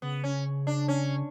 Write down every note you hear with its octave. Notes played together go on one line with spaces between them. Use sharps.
C#3 B3
C#4
D4
C#4